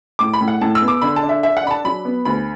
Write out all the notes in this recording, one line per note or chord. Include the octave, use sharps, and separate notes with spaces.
A2 D6
B5
A2
F#5
A2 A5
E6
B3
D6
D3 B5
A5
D4
E5
D4 E5
F#5
D4 B5
A5
F#3 B5
B3
D2 B5